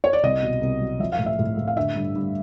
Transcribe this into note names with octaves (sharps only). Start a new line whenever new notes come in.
C#5
D5
C2 D#5
B2
C2
F#3
F3 E5
F5
A2
E5
A2
A2
F5
D3 E5
G2
G2